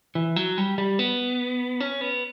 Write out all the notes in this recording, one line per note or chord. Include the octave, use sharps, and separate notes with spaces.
E3
F#3
G3
G3
B3
C#4
B3